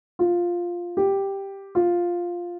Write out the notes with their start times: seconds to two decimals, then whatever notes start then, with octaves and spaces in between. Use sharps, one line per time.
0.19 F4
0.97 G4
1.75 F4